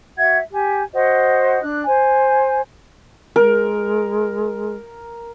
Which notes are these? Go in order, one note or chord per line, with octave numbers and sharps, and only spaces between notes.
F#4 E5 F#5 G#6
G4 G#5
F#4 C5 D#5 F#5
D4 F#6
C5 G#5
G#3 A#4